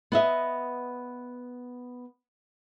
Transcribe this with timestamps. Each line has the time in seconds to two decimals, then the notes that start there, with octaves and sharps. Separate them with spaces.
0.12 B3 D#5 E5